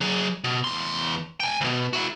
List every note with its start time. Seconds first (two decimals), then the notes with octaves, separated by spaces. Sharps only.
0.01 F#3 G#4
0.44 B2
0.64 E2 C6
1.40 G5 G#5
1.61 D2 B2
1.93 E4 F#4